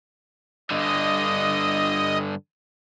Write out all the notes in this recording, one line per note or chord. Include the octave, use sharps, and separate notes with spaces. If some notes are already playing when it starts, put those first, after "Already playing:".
G2 D3 D#5